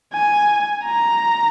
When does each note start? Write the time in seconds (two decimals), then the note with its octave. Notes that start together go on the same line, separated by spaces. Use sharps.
0.13 G#5
0.84 A#5